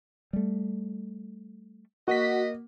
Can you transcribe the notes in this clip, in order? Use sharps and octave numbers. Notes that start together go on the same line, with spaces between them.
G3 A3
A#3 F#4 D#5 B6